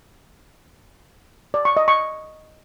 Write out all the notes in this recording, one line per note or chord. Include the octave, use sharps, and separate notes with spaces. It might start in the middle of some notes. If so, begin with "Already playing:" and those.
D5
C#6
D#5
C#6